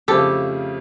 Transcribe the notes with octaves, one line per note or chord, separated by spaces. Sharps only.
F2 C#3 F3 A3 G4 A4